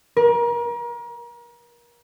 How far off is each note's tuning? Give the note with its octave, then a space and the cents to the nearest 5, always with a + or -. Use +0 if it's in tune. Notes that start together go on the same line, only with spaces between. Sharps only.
A#4 +35